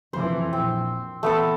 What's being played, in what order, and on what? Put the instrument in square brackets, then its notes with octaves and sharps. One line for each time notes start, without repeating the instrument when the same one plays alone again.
[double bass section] F2 E3 [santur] C5
[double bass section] A#1 [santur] C4
[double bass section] E3 [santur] A3 B3 A4